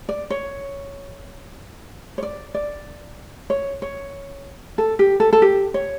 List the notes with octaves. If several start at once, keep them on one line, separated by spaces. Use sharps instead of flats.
D5
C#5
C#5
D5
D5
C#5
C#5
A4
G4
A4
A4
G4
C#5